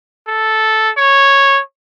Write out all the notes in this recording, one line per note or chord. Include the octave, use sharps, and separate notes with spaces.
A4
C#5